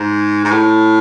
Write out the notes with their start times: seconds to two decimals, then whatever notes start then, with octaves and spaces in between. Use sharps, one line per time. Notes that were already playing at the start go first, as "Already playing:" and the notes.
Already playing: G#2
0.44 G#2
0.52 A2